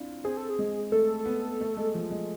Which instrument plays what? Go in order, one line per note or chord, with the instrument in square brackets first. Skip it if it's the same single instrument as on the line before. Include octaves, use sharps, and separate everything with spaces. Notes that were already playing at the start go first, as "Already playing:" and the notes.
Already playing: [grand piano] C4 D4 E4 F4
[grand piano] C4 [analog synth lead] G#4
[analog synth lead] A4
G#4
[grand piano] G#3
[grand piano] A3 [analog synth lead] A4
[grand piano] B3
A3
G#3
F3
G#3